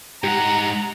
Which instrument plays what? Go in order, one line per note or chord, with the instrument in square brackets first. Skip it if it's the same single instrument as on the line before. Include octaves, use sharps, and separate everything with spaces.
[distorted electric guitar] G#2 F#5 [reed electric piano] G4 [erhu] A#5